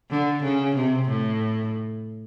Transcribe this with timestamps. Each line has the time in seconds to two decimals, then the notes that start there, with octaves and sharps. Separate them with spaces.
0.11 D3
0.43 C#3
0.76 C3
1.09 A2